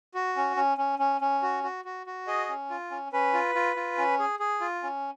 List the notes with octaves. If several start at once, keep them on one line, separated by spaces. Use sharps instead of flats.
F#4
C#4
C#4
C#4
C#4
C#4
F#4
F#4
F#4
F#4
G#4 D#5
C#4
F4
C#4
C#4 B4
F4
F4
F4
C#4
G#4
G#4
F4
C#4